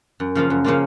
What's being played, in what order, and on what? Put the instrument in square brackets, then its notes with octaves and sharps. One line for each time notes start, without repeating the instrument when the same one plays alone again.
[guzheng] F#2
C#3 F3 A#3 F4
F#2
C#3 F3 A#3 F4